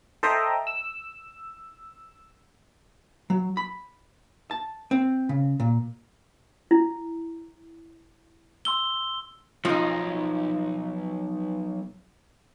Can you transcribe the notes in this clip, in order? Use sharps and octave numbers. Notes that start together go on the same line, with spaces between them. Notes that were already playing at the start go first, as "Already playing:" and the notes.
A4 C5 D#5 E5 G5 A#5
E6
F#3
B5
A5
C4
C#3
A#2
E4
C6 E6 G7
B1 F3 D#4